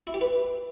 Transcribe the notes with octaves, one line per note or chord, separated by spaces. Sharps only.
E4
G4
B4